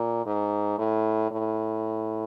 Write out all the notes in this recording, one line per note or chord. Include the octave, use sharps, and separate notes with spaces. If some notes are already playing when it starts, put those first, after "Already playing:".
Already playing: A#2
G#2
A2
A2